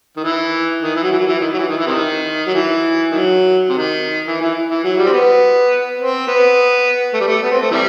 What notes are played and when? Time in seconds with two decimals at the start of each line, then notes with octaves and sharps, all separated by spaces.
0.16 D#3
0.24 E3
0.82 D#3
0.96 E3
1.03 F#3
1.11 E3
1.19 F#3
1.27 E3
1.39 D#3
1.54 F#3
1.58 E3
1.68 D#3
1.78 E3
1.87 C3 D#3
2.46 F#3
2.54 E3
3.12 D#3 F#3
3.69 C3 D#3
4.27 E3
4.41 E3
4.70 E3
4.84 F#3
4.98 G3
5.06 C4
5.13 B3
5.99 C4
6.28 B3
7.14 A3
7.21 G3
7.28 A3
7.42 B3
7.52 C4
7.62 A3
7.71 C3 E3 G3